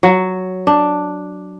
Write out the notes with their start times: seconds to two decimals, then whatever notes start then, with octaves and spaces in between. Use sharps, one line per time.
0.03 F#3
0.67 D4